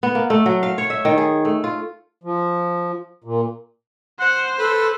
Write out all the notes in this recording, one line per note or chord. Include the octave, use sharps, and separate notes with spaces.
B3
A#3
A3
F#3
F5
C#5
E5
D#3
G#4
A3
F4
F3
A#2
C5 F#5
A4 B4